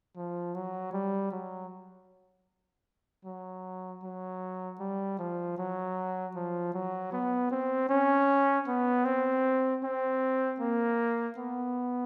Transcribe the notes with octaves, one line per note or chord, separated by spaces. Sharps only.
F3
F#3
G3
F#3
F#3
F#3
G3
F3
F#3
F3
F#3
B3
C4
C#4
B3
C4
C4
A#3
B3